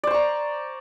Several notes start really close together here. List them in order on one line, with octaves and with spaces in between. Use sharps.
D5 C5 C#6 A#5